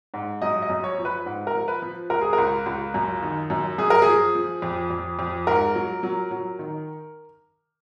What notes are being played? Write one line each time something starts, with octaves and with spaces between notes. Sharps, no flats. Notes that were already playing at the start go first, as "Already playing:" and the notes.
G#2
F#2 D#5
D#5
F#2
C#5
F3
B4
G#2
A#4
F3
B4
F3
C#2 A#4
G#4
A#4
C#2
C#2
F#2
D#3
F#2
F#2 G#4
A#4
F3 G#4
F3
F2
F2
F2
G#2 A#4
F#3
F#3
F#3
D#3